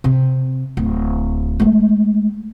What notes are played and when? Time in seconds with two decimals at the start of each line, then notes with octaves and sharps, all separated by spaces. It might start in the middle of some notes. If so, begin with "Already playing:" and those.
0.04 C3
0.77 D1
1.60 G#3 A3